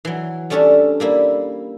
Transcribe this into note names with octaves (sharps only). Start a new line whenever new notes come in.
E3 F#3
G3 A3 C#4 D4 A4
G3 A#3 E4